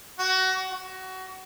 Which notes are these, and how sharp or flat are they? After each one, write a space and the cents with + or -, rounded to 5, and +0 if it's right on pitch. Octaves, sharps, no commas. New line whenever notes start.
F#4 +25
F#4 +20